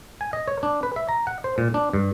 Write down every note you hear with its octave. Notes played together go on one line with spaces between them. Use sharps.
G#5
D#5
C#5
D4
B4
E5
A#5
F#5
C5
A#2
D4
G2